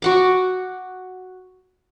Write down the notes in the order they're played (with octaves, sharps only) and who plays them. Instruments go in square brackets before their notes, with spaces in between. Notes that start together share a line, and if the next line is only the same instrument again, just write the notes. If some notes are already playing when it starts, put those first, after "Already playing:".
[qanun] F#4 F#5 D6